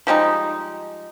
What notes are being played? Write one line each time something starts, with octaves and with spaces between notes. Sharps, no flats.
F3 G3 G#3 D#4